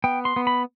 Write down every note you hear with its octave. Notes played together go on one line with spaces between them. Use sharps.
B3 G5
C6
B3
B5